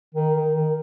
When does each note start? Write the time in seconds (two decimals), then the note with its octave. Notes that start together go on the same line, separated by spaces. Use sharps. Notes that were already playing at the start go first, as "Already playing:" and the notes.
0.15 D#3
0.35 D#3
0.55 D#3